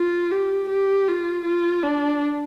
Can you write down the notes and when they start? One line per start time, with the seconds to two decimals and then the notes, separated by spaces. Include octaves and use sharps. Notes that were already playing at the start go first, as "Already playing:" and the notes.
Already playing: F4
0.32 G4
0.69 G4
1.08 F4
1.45 F4
1.83 D4